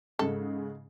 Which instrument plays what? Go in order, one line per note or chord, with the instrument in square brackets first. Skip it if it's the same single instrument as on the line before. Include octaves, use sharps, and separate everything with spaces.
[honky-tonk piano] G#2 C#3 G#3 [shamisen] A4